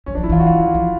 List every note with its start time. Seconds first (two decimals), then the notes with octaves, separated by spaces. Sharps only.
0.06 G3 C#4
0.15 D4
0.18 F#3
0.24 E4
0.29 E3 F4
0.40 F#4
0.46 F4
0.75 F3